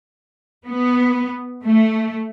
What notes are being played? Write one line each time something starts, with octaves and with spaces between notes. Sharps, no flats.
B3
A3